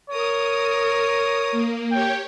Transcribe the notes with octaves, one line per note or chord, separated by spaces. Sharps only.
A#4 C#5 D#6
A#3
G4 C#5 G5